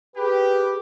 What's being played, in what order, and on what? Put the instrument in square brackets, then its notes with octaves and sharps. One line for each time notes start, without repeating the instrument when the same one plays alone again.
[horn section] G4 [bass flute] G#4 [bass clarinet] B4